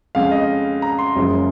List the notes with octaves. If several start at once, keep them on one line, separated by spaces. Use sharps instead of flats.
F2 C#3 G#3 F5
D#5
A#5
C6
F#1 F#2 C#3 F3 G#3